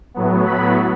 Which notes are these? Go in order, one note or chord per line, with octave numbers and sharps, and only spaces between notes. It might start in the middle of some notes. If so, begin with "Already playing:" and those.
A2 F#3 B3
B5